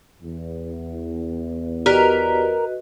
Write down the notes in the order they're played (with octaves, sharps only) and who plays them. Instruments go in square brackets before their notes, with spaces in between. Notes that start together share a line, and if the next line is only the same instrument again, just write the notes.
[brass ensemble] E2
[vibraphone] F#4 B4 D#5 [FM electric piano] G4 D5 B6 [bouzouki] A#4